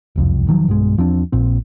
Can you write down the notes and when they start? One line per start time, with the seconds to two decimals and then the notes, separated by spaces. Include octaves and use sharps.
0.16 E1 C2 F2
0.48 E1 D#3 F3 F#3
0.67 B1 G2 B2 G#3
0.97 E2 F3 C4 D4
1.32 A#1 A#2 C4